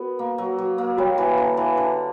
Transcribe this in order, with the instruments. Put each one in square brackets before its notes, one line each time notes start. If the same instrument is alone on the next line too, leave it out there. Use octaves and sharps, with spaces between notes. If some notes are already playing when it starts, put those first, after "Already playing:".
Already playing: [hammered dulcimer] B3 [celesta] F#4 A#4
[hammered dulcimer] A#3
F#3
F#3
A#3
[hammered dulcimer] G3 [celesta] F#4 C#5 G5
[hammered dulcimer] E3
D3
E3
D3